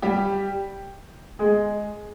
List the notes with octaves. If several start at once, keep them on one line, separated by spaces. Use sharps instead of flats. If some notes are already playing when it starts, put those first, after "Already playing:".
G3 G4
G#3 G#4